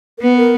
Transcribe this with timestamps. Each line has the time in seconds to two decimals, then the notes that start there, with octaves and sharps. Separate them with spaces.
0.18 A#4
0.22 B3 B4
0.37 A#4